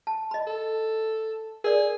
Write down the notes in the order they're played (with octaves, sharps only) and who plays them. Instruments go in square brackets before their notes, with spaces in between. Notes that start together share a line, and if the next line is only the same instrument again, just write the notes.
[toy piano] A5
D#5 B5
[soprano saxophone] A4
[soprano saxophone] G#4 [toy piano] A#4 D5